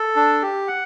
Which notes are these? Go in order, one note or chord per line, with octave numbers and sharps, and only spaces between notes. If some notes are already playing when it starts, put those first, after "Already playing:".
Already playing: A4
D4
G4
F#5